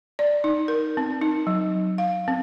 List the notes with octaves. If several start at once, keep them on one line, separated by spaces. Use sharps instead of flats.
D5
D#4
A#4
C4
D#4
F#3
F5
C4